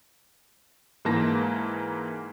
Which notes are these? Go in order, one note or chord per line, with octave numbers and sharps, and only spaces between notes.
G#2 E3 A#3 A5 A#6